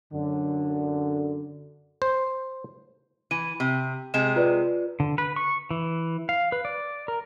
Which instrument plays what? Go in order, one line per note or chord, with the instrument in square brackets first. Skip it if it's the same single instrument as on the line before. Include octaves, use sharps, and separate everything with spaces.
[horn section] F#2 D3
[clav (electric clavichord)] C5
[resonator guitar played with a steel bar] E3 [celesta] D#7
[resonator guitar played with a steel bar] C3
[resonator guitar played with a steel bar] C3 G#3 [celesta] E7
[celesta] F4 B4 D5
[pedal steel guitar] D3
B4
C#6
E3
F5
B4
D5
A#4